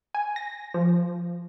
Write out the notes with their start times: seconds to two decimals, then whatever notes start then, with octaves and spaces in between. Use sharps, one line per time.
0.14 G#5
0.36 A#6
0.74 F3